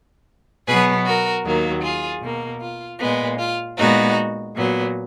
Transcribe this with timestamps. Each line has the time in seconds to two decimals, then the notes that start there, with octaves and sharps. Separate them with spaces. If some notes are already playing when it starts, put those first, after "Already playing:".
0.67 B2 F#3 B3 G#4 B4
1.06 F#4 A#4
1.45 D#2 D#3 F#3 A#3
1.83 F4 G#4
2.22 B2 A#3
2.62 F4
2.99 A#2 G#3 B3
3.39 F4
3.77 A#2 G#3 B3 D#4 F#4
4.55 A#2 F#3 B3